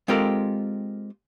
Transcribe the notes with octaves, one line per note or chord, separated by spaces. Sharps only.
G#3 C4 F4 G4 A4 A#4